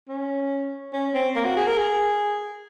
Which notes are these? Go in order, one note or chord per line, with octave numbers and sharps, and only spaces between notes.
C#4
C#4
C4
A#3
F#4
G#4
A#4
G#4